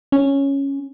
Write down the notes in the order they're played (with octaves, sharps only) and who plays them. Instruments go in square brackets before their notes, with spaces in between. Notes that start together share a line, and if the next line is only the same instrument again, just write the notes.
[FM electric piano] C#4